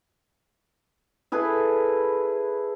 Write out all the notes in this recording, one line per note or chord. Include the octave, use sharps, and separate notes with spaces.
E4 G#4 A4 B4